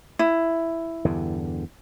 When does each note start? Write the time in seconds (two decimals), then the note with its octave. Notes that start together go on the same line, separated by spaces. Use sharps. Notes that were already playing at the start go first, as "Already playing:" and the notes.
0.19 E4
1.05 E2 G2 D3